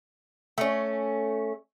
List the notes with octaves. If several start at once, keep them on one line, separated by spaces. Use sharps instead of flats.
A3 C#4